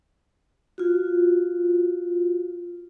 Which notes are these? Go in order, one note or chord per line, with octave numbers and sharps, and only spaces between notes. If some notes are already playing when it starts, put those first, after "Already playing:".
F4 F#4